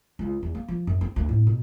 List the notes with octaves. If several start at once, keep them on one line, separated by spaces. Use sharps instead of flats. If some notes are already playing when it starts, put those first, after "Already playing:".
C#2
E2
A#3
F3
F#2
C4
D2
A2
B2